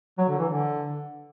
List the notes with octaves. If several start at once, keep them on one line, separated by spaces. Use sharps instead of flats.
F#3
D3
E3
D3